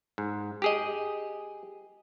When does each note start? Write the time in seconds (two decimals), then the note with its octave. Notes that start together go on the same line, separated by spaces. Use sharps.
0.18 G#2
0.62 G4 G#4 D#5